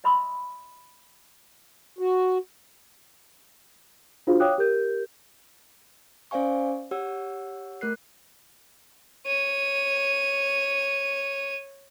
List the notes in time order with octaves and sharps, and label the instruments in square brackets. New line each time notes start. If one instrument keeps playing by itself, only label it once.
[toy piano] D#5 E5 B5 C6 D#6 E6
[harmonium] F#4
[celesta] D4 F4 F#4 G#4 C5 F5
C#5 F5 G5 D6 D#6 F#6
G4 A#4 G6
[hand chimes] C#4 C5 D5 F5 G#5 C#6
G4 C#5 F#5 E6
A3 A#4 F#6 C7
[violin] C#5 D#7